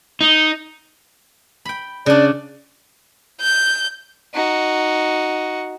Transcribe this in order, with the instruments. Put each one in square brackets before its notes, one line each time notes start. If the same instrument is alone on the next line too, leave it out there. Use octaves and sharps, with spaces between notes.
[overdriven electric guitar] D#4
[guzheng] G5 B5
[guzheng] C#3 D4 [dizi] D5
[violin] G6
[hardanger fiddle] D#4 F#4